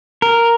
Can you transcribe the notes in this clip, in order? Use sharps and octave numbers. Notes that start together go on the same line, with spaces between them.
A#4